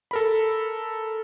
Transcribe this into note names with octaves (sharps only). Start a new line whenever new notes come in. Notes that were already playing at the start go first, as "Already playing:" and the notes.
A4 A#4 B5